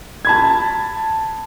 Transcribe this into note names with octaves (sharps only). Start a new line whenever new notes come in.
A5 B5 G#6